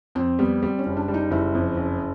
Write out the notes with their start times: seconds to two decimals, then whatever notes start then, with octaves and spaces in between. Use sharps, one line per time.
0.15 F2 C4
0.39 G3 B3
0.62 G3 C4
0.79 C#4
0.86 F#1
0.97 D4
1.08 G3
1.14 D#4
1.31 F#1 E4
1.55 F2
1.77 F#1